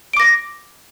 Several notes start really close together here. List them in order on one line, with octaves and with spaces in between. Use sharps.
D7 D6 A#6